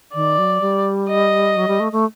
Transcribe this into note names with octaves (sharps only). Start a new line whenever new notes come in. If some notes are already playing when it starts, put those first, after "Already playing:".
D#3 D5
F#3
G3
D#5
F#3
G3
A3
A3